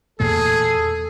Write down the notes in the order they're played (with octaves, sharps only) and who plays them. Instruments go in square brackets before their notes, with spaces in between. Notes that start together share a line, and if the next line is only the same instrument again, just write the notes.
[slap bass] E2 A#2 A3 [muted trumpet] G#4 [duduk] A4